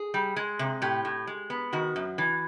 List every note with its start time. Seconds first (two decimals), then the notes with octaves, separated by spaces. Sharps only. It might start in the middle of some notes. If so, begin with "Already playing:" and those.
Already playing: G#4
0.14 G3
0.36 G#3
0.59 C3
0.82 A2 G4
1.05 A2
1.27 G#3
1.50 B3
1.73 D#3 F#4
1.96 F#2
2.18 E3